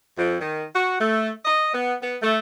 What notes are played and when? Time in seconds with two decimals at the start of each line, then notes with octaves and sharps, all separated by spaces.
0.18 F2
0.40 D#3
0.76 F#4
1.00 A3
1.45 D#5
1.74 B3
2.02 B3
2.21 A3